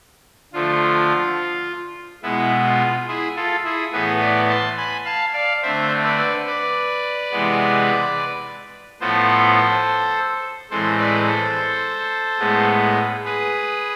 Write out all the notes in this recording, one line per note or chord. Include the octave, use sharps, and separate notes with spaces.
D3 F3 A3 F4
B2 G#3 B3 E4
F4
E4 G#4
F4 A4
E4 G#4
A2 E3 B3 G#4 B4
B4 D5
A5 C6
G#5 B5
F5 A5
D5 F5
D3 A3 C4 C5 E5
B4 D5
B4 D5
C3 E3 G#3 B3
A2 F3 B3 A4 C5
A2 E3 G#3 C4 A4 C5
B4 D5
A4 C5
A2 G#3 B3
G#4 B4